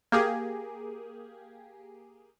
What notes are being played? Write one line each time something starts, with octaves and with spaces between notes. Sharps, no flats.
A#3 G4 G#4